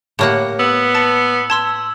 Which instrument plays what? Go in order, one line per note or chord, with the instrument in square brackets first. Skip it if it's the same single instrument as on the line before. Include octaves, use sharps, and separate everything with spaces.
[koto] A2 A#3 F#5 [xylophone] G4 C#5
[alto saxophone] B3 [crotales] E6
[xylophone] A5 A6 C#7
[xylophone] A5 C6 E6 [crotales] G#6